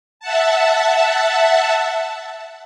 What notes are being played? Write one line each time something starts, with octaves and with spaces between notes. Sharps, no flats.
E5 F#5 A5